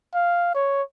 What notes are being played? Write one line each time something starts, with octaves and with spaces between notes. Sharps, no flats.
F5
C#5